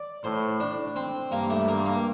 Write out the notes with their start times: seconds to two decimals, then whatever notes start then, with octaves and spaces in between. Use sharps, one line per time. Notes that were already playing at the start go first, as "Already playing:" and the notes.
Already playing: D5
0.24 A2 C5
0.60 D4
0.96 C4
1.32 G2 A#3
1.50 A3
1.68 A#3
1.85 A#3